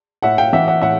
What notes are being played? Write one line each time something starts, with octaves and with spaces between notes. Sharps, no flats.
A2 E5 F#5
F5 G5
E3 E5 F#5
E5 F#5
A2 E5 F#5